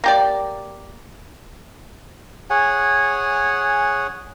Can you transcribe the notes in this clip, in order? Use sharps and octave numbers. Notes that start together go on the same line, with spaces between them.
A#3 G4 D5
G#4 C#5 F#5 G#5